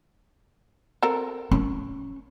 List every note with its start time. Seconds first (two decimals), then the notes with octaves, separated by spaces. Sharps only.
1.02 C4 A4 A#4
1.51 C#4